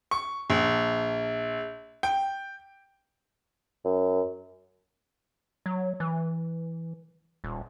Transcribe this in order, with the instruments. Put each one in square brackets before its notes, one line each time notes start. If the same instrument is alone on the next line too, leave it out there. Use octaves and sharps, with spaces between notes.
[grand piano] C#6
A#1
G5
[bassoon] F#2
[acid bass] F#3
E3
D#1